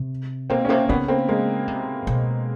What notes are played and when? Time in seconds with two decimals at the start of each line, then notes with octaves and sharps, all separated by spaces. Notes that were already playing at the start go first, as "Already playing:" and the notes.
Already playing: C3
0.50 B2 A#3 C4
0.65 C#4
0.69 C3 A#3 C4
0.89 C#3 B3 C#4
1.08 A#3 C4
1.29 G#3 A#3
1.68 C3
2.07 B2